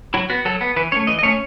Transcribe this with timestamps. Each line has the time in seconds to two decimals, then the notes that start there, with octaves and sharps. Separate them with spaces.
0.14 F#3 E4
0.30 B3 F#4
0.45 F#3 A4
0.61 B3
0.76 E3 B4
0.92 A3 C#4 C#5
1.07 E3 D#5
1.19 D#5
1.23 A3 C#4 C#5